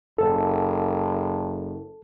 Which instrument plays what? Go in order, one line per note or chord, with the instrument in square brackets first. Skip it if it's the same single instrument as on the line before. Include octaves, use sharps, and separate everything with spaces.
[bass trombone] F#1 [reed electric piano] A4